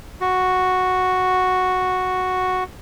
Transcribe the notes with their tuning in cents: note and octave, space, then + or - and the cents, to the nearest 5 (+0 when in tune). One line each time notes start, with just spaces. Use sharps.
F#4 -5